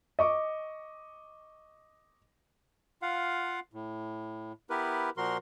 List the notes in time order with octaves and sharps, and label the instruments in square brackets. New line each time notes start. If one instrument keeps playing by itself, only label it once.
[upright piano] D#5 C#6 D6
[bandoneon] F4 F5 F#5
A2
B3 E4 G4 A#4 B4
A#2 F3 F#4 A#4 C6